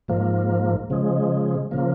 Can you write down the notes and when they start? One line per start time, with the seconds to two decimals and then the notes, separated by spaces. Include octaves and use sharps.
0.08 G#2 F3 A#3
0.90 C#3 F3 G#3
1.71 C#3 F3 A#3